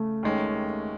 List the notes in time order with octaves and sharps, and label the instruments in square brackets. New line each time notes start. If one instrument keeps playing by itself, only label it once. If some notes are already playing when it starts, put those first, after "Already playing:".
Already playing: [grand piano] C#3 [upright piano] A3
[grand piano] D#2 D#3 G#3 C#4